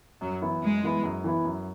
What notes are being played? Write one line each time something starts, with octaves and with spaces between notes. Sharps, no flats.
F#2 F#3
E3 B3 E4
F#2 G#3
E3 B3 E4
F#2
E3 B3 E4
F#2